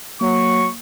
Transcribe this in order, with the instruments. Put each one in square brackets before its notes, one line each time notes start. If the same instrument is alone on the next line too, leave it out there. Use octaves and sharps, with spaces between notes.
[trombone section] F#3 [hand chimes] A#3 [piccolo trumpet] C#6